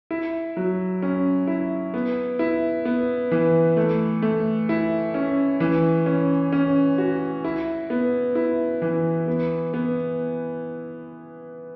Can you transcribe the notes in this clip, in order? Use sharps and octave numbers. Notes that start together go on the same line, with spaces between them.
E4
F#3
C#4
E4
B3
E4
B3
E3
A3
A3
E4
C#4
E3
C#4
C#4
F#4
E4
B3
E4
E3
B3
B3